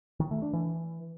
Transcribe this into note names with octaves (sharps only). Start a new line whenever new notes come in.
D#3
A3
D4
E3